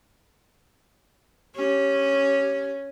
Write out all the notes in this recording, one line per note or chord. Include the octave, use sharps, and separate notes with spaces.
C#4 G4